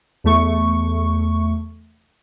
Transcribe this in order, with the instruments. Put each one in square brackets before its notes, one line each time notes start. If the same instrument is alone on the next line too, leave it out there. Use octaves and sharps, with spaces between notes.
[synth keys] E2 A3 C#6